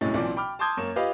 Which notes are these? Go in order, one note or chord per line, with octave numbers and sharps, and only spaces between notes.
D1 A2 C3 G#3 C#4 A6
B1 A#2 E3 C4 D5
G5 B5 D6 F6
A5 C6 D6 D#6 G6 G#6
F#2 A#3 C#5 E7
F4 G4 B4 D#5 F5